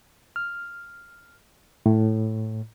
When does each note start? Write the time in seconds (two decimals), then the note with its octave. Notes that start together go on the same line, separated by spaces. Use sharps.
0.36 F6
1.86 A2